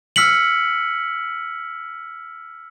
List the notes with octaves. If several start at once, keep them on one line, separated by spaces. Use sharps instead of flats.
E6 F6 B6 C#7 F#7